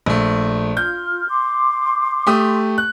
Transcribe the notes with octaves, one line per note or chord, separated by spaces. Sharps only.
A#1 A3
F4 F6 G6
C6 D6
A3 G4 D#6
F#6